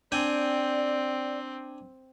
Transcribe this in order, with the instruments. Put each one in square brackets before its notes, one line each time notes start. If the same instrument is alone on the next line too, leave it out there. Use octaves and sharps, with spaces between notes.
[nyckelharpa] C4 [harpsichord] D4 G5 G#5 [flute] D5